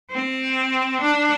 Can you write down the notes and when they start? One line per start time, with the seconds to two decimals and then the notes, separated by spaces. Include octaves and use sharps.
0.12 C4
1.02 D4